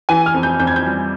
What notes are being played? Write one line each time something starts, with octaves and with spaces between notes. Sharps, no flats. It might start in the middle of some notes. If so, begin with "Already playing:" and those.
E3 G#5
F6
F2
G6
F2 G6
G#6
G6
G3